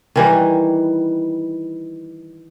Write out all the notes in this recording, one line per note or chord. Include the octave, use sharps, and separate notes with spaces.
D#3 E3 G3